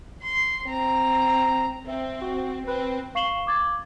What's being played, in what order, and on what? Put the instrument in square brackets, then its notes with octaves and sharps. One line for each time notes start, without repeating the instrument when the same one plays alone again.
[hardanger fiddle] C6
C4 A#5
[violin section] C4 [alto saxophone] E5
[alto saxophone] F#4
[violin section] C4 [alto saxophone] B4
[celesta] F5 C#6 C7 E7 F#7 G7
D6 G#6 A6